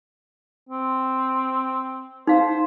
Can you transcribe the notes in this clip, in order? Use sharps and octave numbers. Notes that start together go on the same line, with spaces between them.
C4
D#4 C5 F5